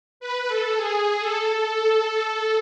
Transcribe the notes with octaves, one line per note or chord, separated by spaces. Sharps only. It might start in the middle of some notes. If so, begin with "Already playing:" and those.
B4
A4
G#4
A4